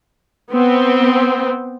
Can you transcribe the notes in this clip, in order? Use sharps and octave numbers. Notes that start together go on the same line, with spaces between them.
B3 C4